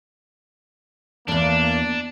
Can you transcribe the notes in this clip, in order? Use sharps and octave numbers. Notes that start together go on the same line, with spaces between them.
E2 G2 A#3 D4